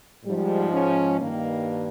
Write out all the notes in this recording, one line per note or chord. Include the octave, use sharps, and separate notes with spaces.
G#2 F3 G3
C#4
G2 D#3 A#3